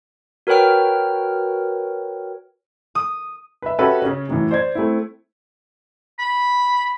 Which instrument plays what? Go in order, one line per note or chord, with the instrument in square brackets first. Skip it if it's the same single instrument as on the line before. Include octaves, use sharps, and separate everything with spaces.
[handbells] F#4 A#4 B4 C#5 G5 F6
[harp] D#6
[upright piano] B4 E5
C#4 F#4 G4 A4 B4 E5
C#3 C#4
F#2 A2 E3
C5 D5 G#6
A3 C4 E4
[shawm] B5